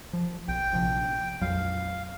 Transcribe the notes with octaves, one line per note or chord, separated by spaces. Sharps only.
F3
B1 G5
A#1 C3 F3
A#1 F2 F#3 F5